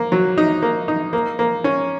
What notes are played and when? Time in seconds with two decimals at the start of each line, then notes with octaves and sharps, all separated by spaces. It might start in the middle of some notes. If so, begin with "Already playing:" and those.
Already playing: A#3
0.12 F#3
0.38 D#4
0.62 A#3
0.88 D#4
1.13 A#3
1.39 A#3
1.64 C#4